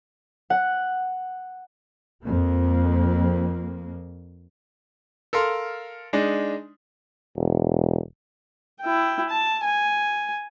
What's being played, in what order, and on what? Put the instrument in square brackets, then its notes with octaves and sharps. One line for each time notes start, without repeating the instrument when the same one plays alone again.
[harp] F#5
[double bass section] F2 A#3
[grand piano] A4 A#4 F5 C6
G#3 D4 D#4
[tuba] E1
[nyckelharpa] E4 G5
A5
G#5